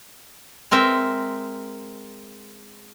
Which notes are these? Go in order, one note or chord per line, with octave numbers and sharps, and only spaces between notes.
G#3 C4 A#4 E5